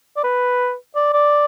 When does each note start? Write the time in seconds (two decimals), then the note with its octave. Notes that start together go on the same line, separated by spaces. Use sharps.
0.17 D5
0.24 B4
0.96 D5
1.13 D5